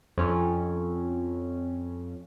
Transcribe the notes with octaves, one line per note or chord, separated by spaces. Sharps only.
F2 C#4